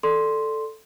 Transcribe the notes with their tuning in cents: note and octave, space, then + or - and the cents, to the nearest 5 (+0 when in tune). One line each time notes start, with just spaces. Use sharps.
A4 +0 D5 +0 C6 +0